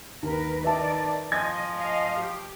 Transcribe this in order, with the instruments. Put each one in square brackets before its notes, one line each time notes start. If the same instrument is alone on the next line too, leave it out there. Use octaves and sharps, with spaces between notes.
[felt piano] D#2 [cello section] A#4 B4
[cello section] D#3 D5 [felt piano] B4 E5 A5
[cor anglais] F3 [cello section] D#5 [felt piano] G#5 G#6 A#6
[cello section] D#5 F5
G4